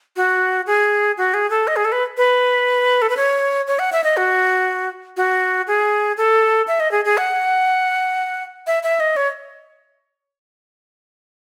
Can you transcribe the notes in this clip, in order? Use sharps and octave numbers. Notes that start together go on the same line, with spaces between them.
F#4
G#4
F#4
G#4
A4
D#5
G#4
A4
B4
B4
A4
B4
C#5
C#5
F#5
E5
D#5
F#4
F#4
G#4
A4
E5
D#5
G#4
G#4
F#5
E5
E5
D#5
C#5